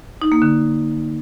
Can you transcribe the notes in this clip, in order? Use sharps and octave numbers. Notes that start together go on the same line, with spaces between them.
D#4
A#3
D3